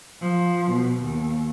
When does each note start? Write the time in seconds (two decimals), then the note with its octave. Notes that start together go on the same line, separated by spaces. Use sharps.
0.22 F3
0.71 B2
1.02 D#2